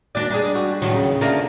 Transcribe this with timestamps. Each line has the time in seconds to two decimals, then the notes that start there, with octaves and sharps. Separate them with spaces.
0.15 D#2 D4 F#4 D5
0.30 G2 D4 D#4 G#4
0.55 G3 F#4
0.82 E2 A2 D#3 F#3
0.93 D#2 C#3
1.21 D3 A3 A#3 F4 A#4